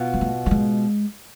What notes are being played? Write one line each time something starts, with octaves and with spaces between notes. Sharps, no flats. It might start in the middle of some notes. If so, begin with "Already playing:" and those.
Already playing: B2 B3 F4
G#3
A3
A3
G#3